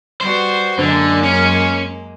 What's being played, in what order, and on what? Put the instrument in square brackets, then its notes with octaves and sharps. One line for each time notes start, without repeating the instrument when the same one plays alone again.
[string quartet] G3 B3 F#4 [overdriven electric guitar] C5
[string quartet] F#2 G#3 A#3 [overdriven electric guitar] D3
[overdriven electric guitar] C#4